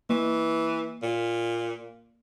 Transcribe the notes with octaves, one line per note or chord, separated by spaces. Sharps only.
E3 A#3
A#2